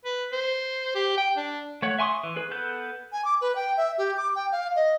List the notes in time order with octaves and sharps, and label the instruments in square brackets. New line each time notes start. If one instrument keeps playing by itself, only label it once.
[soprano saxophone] B4
C5
G4
G5
D4
[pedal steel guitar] A3 C#5 F#5
E5 G#5 C6 C#6 D#6
E3
G#4 B4
B3 A4 B4 G6
[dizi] G#5
D6
B4
G5
E5
G4
D6
G5
F5
D#5